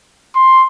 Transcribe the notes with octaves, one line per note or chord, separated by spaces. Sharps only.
C6